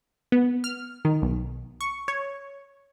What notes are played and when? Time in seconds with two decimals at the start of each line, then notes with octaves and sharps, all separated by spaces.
0.32 B3
0.64 F6
1.05 D#3
1.22 B1
1.81 C#6
2.08 C#5